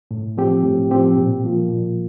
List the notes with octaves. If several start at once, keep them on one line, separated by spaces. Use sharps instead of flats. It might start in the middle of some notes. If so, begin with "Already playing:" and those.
A2
F3 C4 G4
A2
F3 C4 G4
A#2
F3 A#3 F4
A#2